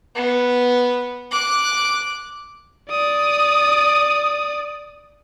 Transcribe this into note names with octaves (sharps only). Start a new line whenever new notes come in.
B3
D6 F#6
D5 D#6